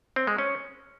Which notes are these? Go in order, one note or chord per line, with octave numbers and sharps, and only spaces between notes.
C4
G#3
C#4